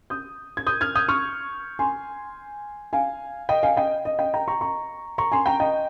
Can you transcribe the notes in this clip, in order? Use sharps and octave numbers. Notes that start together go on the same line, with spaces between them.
D#6 G6
G#6
D#6 G6
F6 G#6
D#6 G6
C#6 F6
G#5 C6
F5 G#5
D#5 G5
F5 G#5
D#5 G5
D#5
D#5 G5
G5 A#5
A#5 C#6
A#5 C#6
A#5 C#6
G#5 C6
G5 A#5
D#5 G5